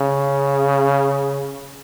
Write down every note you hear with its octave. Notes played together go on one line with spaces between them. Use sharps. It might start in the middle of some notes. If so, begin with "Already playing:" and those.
Already playing: C#3